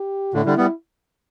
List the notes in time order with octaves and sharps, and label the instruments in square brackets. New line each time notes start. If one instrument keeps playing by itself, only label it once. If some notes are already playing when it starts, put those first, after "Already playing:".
Already playing: [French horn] G4
[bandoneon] A2 D3 [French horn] E4
[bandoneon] D3 G3
G3 B3